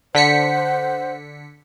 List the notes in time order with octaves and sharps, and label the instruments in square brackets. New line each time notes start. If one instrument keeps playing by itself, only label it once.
[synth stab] D3 B6 C#7 [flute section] C5 F#5